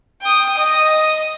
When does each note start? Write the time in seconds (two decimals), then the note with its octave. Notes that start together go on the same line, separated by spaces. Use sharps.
0.22 G5 D#6
0.57 D#5